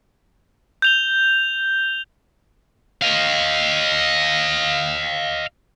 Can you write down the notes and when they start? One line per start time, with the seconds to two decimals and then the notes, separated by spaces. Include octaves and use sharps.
0.82 G6 F7 G7
3.02 D#5 F5